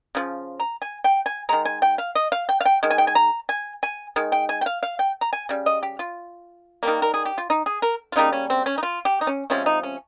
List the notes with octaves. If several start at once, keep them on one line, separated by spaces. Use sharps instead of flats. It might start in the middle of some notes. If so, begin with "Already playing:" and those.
C#3 F3
A#5
G#5
G5
G#5
D#3 G#3 A#5
G#5
G5
F5
D#5
F5
G5
F5
G5
D#3 G#3
G#5
G5
G#5
A#5
G#5
G#5
D#3 G#3
G5
G#5
G5
F5
F5
G5
A#5
G#5
C#3 G3
D#5
G4
F4
D#3 G3 A#3
A#4
G#4
G4
F4
D#4
G#4
A#4
F4
C#3 G3 A#3 D#4
C#4
C4
C#4
D#4
F4
G4
D#4
C#4
C3 F3 G#3 C#4
D#4
C#4